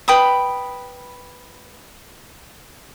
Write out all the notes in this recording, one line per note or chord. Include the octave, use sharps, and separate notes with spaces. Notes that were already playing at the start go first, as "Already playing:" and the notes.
B4 G5 B5 D#6